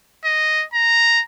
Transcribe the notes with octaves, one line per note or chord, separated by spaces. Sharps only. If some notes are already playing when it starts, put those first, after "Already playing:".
D#5
A#5